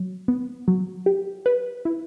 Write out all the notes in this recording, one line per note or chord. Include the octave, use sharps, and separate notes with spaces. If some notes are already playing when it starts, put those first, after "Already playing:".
Already playing: F#3
B3
F#3
G4
B4
E4